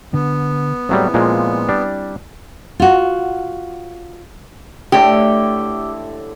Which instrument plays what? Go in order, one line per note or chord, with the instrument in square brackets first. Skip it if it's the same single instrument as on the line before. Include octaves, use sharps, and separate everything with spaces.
[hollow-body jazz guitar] D3 [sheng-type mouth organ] B3
[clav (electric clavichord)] A2 F#3 G3 [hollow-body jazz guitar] C4 E4 G#4
[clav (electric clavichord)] A#2 F3 G#3
G3 D4
[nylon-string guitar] F4 F#4
[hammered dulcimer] A2 D3 A4 [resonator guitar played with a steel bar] G4